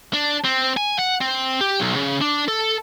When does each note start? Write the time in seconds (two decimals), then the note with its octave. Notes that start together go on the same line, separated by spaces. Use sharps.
0.13 D4
0.44 C4
0.77 G#5
0.99 F#5
1.21 C4
1.61 G4
1.80 B1
1.95 C#3
2.21 D4
2.48 A4